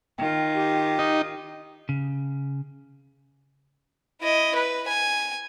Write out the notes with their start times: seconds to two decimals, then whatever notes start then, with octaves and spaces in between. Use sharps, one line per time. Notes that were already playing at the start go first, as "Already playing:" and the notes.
0.18 D#3 F4 G5
0.56 G4
0.99 D#4
1.89 C#3
4.21 E4 D#5
4.55 B4
4.88 G#5